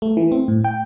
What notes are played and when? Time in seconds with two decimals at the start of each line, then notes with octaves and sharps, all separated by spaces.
0.02 A3
0.17 E3
0.32 C4
0.48 A2
0.64 G5